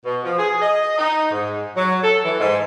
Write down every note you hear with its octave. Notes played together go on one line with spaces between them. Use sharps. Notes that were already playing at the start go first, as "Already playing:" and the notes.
B2
F3
G#4
D#5
D#4
G#2
F#3
A4
E3
G#2